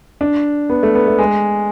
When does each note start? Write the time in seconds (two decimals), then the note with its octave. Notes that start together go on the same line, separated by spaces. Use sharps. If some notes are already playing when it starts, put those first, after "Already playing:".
0.21 D4
0.70 B3
0.83 A3
0.95 B3
1.07 A3
1.18 G#3